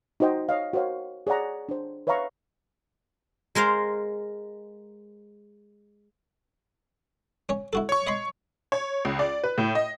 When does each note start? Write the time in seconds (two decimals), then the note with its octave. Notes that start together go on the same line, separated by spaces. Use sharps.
0.20 D#4 F#4 C5 D#5 G5
0.49 C#5 D#5 F5
0.73 F#4 A#4 C5 C#5 F5
1.27 G#4 C#5 D5 F#5 A#5
1.69 D4 C5
2.07 B4 C#5 E5 F5 A#5 C#6
3.55 G#3 A#4 C5 F5
7.49 C#4 C#5
7.73 E4 F#4 A4
7.89 C#5 C#6
8.07 D#5 B5 C6
8.72 C#5
9.05 C#2
9.19 D5
9.44 B4
9.58 A2
9.75 D#5